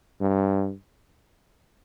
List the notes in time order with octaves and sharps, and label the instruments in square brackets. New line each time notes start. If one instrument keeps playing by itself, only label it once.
[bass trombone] G2